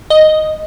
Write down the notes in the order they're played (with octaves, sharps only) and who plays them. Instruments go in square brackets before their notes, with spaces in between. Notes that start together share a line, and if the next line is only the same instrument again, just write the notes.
[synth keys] D#5